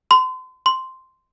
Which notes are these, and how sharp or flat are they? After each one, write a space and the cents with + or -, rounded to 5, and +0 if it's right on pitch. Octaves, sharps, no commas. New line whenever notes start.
C6 -35
C6 -5